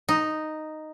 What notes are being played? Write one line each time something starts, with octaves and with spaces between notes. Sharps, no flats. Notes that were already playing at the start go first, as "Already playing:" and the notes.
D#4